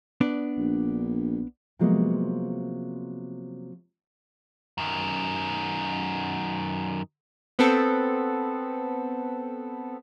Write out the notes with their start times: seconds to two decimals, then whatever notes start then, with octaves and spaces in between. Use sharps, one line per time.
0.21 B3 D4 D5
0.57 A#1
1.79 C3 F3 F#3 G#3 A#3 B3
4.78 F#2 D#3
7.59 B3 C4 A4